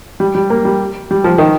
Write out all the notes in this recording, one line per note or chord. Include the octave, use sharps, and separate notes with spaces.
G3
G3
A#3
G3
G3
F3
D#3